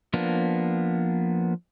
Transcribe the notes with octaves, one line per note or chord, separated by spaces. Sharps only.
F3 A#3 B3 D4